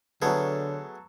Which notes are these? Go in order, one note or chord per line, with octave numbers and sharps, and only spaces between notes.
D3 F#3 A3 B3 G#4 A4 B4 C#5